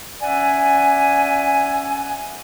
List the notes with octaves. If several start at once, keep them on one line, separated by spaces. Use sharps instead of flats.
C#4 D5 E5 F#5 G#5